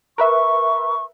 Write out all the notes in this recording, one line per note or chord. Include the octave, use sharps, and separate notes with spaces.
A#4 B4 E5 C#6